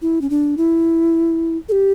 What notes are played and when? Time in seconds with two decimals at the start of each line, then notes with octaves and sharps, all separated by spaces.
0.02 E4
0.21 C#4
0.30 D4
0.57 E4
1.69 A4
1.72 G4